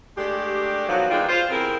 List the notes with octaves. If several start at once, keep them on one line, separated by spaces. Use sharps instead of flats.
G#3 A3 D4 G4
B2 D#3 F3 F#3
E3 G#3 C4 D4 D#4 F4
F4 C5
E2 C3 C4 E4 G#4 A#4